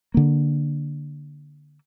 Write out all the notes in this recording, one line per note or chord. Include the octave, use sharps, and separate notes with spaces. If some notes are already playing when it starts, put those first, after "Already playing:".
D3 A#3